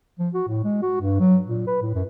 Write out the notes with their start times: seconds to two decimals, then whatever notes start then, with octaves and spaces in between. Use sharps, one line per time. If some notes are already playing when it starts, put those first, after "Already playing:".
0.19 F3
0.34 F#4
0.48 A2
0.64 G#3
0.82 F#4
1.01 G2
1.20 F#3
1.47 A#2
1.67 B4
1.82 A2
1.95 F#2